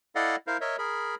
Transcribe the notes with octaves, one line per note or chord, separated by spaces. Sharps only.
E4 A4 D5 D#5 F5 F#5
E4 A#4 C5 F5
A#4 C#5 D#5 E5
G#4 A#4 B5